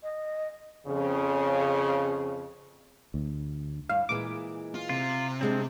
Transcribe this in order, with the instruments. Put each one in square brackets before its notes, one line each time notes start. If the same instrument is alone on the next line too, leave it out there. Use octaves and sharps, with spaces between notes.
[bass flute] D#5
[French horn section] F2 C#3
[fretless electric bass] D2
[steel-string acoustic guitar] G2 [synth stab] F5
[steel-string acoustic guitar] A#2 E3 G#3 [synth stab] D6
[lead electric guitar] F4
[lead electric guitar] C3 [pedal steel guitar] F4
[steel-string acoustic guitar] G3 G#3 D4 [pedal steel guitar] C4